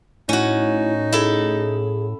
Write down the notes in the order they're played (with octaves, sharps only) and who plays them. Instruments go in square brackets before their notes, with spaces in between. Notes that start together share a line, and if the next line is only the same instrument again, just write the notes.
[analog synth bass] A2 [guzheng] C#4 F#4 [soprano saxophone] D#4 [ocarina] E4
[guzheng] E4 A4 [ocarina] G#4